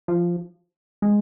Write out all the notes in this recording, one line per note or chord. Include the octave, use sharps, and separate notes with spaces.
F3
G#3